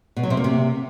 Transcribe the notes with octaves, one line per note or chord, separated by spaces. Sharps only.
B2
F#3
C3
A#3
C3